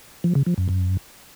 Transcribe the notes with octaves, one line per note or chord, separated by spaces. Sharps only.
F3
C#3
F3
F#2
F#2